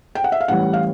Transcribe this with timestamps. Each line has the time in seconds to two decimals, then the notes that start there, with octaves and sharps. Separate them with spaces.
0.15 G5
0.24 F#5
0.32 E5
0.41 F5
0.48 A1 A2 E3 G3 F#5
0.73 F5